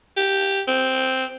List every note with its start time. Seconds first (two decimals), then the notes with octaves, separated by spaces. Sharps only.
0.17 G4
0.68 C4